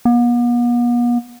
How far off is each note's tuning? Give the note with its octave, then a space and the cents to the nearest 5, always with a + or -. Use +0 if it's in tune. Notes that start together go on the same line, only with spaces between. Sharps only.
B3 -45